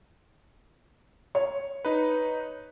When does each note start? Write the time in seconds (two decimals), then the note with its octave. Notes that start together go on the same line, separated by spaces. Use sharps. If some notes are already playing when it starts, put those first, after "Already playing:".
1.35 C#5
1.85 D#4 B4